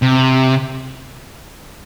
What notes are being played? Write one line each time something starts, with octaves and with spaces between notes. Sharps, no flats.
C3